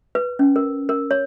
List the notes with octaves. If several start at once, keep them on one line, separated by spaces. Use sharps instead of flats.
B4
C#4
A#4
A#4
C#5